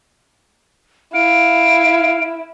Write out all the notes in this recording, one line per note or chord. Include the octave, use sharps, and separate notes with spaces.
E4 F5 D7